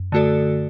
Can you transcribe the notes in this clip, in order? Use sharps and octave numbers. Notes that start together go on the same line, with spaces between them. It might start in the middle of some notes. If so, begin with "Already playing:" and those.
Already playing: F#2
D3 A3 F#4 A4 D5